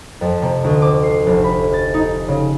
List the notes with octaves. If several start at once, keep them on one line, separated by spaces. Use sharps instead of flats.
F2
C3
D2
D6
C7
F1
B5
A6
D#4
C#3